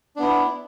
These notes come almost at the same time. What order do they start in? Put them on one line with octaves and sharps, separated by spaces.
D4 B3 E4